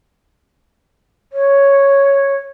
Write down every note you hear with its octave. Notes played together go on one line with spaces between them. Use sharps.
C#5